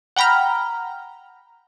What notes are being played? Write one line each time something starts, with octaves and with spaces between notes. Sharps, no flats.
F#5 G5 A#5 B5 F6